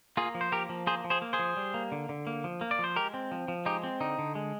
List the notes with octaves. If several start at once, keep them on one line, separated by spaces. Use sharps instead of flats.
A#3 F4 G#4
F3
C5
A#3 G4 A#4
F3
A#3 G#4 C5
F3
G#4 C5
A#3
G#4 C5
F3
G3
A#3
D3
D3
A#3
F3
A#3
D5
F3
C5
G#3 G4 A#4
C4
F3
F3
G#3 D#4 G4
C4
D3 D#4
D3
G#3